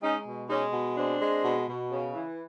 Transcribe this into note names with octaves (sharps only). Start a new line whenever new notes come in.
G#3 C#4 D#4
B2
G#3 C#4 D#4
B2
G#3 C4 D4
G#3
B2
B2
C#3
E3